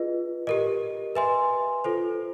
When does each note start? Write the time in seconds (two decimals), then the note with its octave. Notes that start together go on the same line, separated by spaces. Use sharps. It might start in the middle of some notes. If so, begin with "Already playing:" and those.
Already playing: F4 G#4 B4 D#5
0.47 G4 A#4 D#5
1.15 B4 E5 G#5 C6
1.84 F4 A4 C5